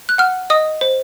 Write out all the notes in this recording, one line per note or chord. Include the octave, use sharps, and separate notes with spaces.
F#6
F#5 F6
D#5 D#6
C5